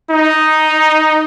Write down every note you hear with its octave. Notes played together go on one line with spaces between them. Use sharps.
D#4